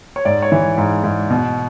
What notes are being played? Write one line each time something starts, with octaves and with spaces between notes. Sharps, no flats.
C#5
G#2 D5
C#5
E3
G#2
G#2
B2